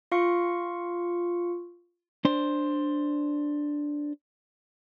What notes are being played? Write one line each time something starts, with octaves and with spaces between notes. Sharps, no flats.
F4 F5 C#6 C#7
D4 C5